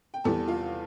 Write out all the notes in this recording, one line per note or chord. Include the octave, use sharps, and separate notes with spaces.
G5
E2 E3 G3 A4 A5
F4 F5